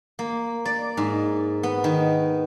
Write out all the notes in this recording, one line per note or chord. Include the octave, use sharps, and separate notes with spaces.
A#3
D5
G#2
B3
D#3